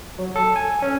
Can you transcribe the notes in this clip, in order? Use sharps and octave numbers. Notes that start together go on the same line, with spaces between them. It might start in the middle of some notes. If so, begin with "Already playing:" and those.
F#3
A4
G#5
C#4